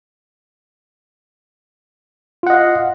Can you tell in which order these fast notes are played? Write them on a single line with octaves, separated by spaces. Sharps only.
F4 F#5 D#5 F5